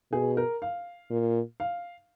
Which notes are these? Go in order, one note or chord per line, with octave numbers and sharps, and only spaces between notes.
B2 G#4
A#4
F5
A#2
F5